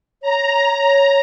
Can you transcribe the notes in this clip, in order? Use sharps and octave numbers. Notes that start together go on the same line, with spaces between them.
C#5 A#5